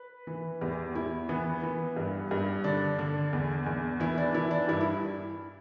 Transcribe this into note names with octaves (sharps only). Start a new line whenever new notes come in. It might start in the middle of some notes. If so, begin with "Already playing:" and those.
Already playing: B4
E3
E2 G4
E2 E4
E3 B3
E3
G2
G2
D3 D4
D3
E2
E2
E3 E4
D4
E3 E4
D4
G2 E4
E4